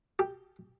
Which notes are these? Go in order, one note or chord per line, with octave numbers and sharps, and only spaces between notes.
G4